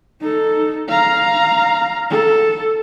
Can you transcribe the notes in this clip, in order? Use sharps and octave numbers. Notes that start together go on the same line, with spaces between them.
D#4 A4
F5 A#5
A4